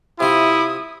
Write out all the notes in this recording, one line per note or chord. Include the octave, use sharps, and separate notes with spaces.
C3 E4 F4 D#6